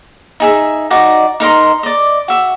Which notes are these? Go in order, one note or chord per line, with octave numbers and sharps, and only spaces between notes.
D#4 G#4 E5
D#4 F#4 D5 D#5
D#4 A#4 D#5 C6
D5 D#5
F#4 E5